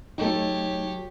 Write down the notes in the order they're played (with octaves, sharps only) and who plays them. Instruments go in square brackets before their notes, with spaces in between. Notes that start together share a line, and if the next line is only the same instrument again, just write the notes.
[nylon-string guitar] F#3 A4 [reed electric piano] A3 D#4 [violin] G4 C#5